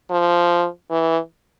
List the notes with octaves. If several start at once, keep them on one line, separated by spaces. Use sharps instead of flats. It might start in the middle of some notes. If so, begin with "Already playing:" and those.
F3
E3